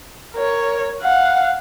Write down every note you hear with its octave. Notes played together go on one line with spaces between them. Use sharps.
A#4 C#5
F5 F#5